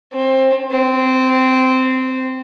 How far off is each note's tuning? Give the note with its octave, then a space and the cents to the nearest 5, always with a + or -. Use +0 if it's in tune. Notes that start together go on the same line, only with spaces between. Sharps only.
C4 +20
C4 -15